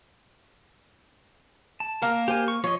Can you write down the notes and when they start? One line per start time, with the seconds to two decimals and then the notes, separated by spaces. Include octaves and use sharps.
1.80 A5
2.02 A#3 A#4
2.28 G4 C5 G#5
2.48 C#6
2.64 F3 C#5 D#5